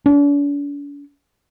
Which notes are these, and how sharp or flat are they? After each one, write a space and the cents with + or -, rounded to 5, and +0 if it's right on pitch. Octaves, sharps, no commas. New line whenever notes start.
D4 -45